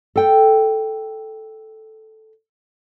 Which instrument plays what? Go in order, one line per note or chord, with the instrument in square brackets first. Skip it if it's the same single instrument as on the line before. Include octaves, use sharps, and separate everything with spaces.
[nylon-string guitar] A4 G5